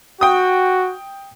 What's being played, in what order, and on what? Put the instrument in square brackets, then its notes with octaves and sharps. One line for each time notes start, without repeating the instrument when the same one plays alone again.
[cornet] F#4 [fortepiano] G5 D#6